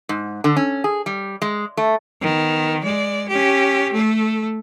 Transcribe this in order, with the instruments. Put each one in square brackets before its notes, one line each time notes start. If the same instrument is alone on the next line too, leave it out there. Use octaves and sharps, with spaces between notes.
[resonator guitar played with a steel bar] G#2
D3
C#4
G#4
G3
G#3
A3
[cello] D#3 B3
G#3 D5
C#4 G4
A3 A4